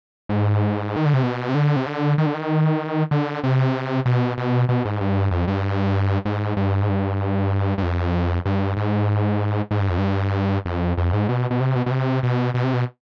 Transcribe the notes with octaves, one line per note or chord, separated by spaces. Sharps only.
G#2
D#3
D3
C3
B2
C3
D3
C3
D3
D#3
D3
D#3
D3
C3
B2
B2
B2
G#2
G2
F2
G2
G#2
G2
G#2
G2
G2
F2
G2
G#2
G#2
G2
F2
G2
F2
F2
G#2
B2
B2
C3
B2
B2
C3
B2
B2
C3
B2